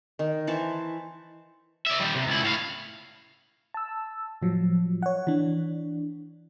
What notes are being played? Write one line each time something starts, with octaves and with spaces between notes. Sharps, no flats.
D#3
E3 C5 A5 C#6
D5 E5
D#3 G3
C3
C#2 E4
A2 F5
A5 E6
A2 F3 F#3
C#5 F#5
E3 D4